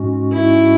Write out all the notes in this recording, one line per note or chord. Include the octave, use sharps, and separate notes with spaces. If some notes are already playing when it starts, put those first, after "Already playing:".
Already playing: G#2 G#3 C#4 F#4
E4